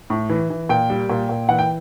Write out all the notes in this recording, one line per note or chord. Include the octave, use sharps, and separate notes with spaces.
A2
E3
E3
A#2 G5
G3
A#2
A#2
E3 F#5
G5